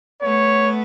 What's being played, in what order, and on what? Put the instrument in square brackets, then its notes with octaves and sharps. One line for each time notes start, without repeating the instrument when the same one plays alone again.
[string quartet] A3 B3 [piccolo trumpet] C#5